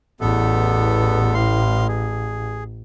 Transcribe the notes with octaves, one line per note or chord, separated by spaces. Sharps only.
A1 E2 B3 A4
A2 F5 C6
G#4